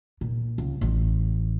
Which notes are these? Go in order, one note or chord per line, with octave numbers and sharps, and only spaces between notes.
A#2
C#2
A1